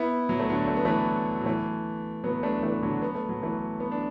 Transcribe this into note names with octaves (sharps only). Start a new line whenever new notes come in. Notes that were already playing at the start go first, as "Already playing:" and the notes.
Already playing: B3 E4
F#3
A3
D3 F#3
A3
B3
E3 A3
F#3
E3 A3
F#3 B3
A3 D4
E3 A3
D3 F#3
B3
A3
F#3
E3 A3
B3
D4